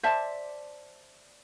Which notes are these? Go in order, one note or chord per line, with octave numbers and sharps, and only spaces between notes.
C5 D5 E5 A5